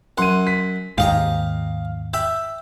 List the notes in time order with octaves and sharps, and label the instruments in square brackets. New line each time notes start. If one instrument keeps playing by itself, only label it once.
[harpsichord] F#2 F#5 [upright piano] C6 D#7
[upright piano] B6
[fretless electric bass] D#2 G#2 [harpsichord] G4 D#5 A#5 [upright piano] F5
[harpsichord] E5 G5 B5 [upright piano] E6